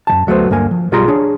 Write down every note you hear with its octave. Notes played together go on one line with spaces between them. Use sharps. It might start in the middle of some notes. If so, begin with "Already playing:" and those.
F#2 E3 A5
D2 F#3 A3 B3 C5
D2 G2 A#3 G#5
F3
B1 G3 F4 G#4 A#5 C6
D4 G#4 C#5